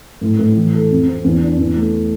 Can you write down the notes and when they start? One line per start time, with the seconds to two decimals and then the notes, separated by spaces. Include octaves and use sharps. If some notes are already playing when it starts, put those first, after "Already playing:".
0.21 A2
0.39 A2
0.57 E3
0.74 A4
0.91 F2
1.07 C4
1.24 E2
1.42 D4
1.58 E2
1.75 A3